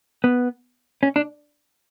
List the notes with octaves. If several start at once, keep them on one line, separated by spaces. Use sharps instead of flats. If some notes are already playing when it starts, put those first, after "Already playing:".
B3
C#4
D4